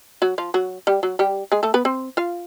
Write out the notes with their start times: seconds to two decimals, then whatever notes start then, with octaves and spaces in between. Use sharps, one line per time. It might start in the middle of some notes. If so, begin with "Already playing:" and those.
0.22 F#3 F#4
0.38 F3 F4
0.54 F#3 F#4
0.87 G3 G4
1.03 F#3 F#4
1.19 G3 G4
1.52 G#3 G#4
1.63 A3 A4
1.74 B3 B4
1.85 C4 C5
2.17 F4 F5